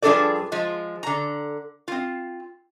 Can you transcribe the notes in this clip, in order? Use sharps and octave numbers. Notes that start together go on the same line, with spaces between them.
G2 F3 D4 G#4 A4 D5
F3 G#3
D3 A#5
C4 F4